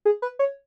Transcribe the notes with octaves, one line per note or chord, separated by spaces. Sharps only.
G#4
B4
C#5